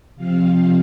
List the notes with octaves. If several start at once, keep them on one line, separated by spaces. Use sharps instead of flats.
C3 F3 C4 F5